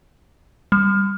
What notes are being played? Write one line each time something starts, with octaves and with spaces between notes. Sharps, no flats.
G3